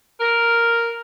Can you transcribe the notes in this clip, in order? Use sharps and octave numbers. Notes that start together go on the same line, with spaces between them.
A#4